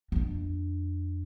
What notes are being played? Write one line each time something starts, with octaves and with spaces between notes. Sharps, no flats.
F2 D4